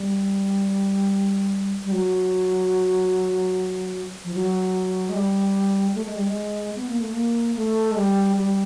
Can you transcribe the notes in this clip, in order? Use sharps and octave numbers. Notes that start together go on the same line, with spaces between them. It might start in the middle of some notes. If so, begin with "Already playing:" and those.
Already playing: G3
G3
F#3
F3
F#3
G#3
G3
A3
G#3
G3
G#3
B3
A#3
A3
A#3
A3
G#3
G3
G3